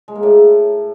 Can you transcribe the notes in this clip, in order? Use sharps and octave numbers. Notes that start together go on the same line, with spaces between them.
G#3
A#3
A2